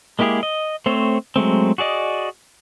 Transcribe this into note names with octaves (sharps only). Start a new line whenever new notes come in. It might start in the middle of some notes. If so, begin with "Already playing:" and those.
G#3 A#3 E4 G4 G#4
D#5
A3 C4 C5 C#5
F#3 G#3 A3 C4
F#4 G#4 D5 D#5